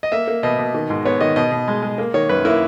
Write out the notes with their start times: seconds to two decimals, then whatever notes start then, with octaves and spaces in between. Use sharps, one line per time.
0.03 D#5
0.12 A#3 E5
0.28 A#3
0.43 B2 D#5
0.59 B2
0.74 D#3
0.90 G#2
1.05 B3 C#5
1.21 D#3 D#5
1.36 B2 D#5
1.52 B2
1.68 G#3
1.83 G#3
1.98 A#3
2.14 D#3 C#5
2.29 F#2 B4
2.45 A#3 E4